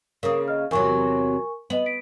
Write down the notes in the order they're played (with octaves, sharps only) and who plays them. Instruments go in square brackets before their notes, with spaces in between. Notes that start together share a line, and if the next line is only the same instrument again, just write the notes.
[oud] C#3 A#3 [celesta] A#4 D#6
[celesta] D#5 F6
[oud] E2 C3 F#3 [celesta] A#4 G#5 C#6
[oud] B3 [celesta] D#5 F#7
[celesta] B6 D7